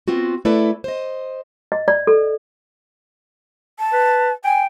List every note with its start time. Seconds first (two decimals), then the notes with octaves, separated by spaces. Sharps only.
0.08 B3 C4 F4 F#4
0.45 A3 E4 A4 B4 D5
0.84 C5 D#5
1.72 D#5
1.88 D5
2.07 A4
3.79 A5
3.93 B4
4.44 G5 G#5